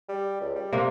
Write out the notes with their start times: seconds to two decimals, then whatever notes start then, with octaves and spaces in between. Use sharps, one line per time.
0.08 G3
0.40 C#2
0.55 G3
0.73 C3 A#3